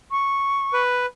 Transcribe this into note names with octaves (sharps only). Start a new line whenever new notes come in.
C#6
B4